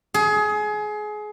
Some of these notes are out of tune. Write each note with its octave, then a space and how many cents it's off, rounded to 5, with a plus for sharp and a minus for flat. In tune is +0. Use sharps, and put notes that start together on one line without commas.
G#4 +25